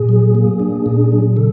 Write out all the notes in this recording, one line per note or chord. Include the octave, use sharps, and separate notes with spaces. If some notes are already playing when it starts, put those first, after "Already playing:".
Already playing: A#2 G#4
F#3
A#3
D4
A#2
F#3
C#3 A4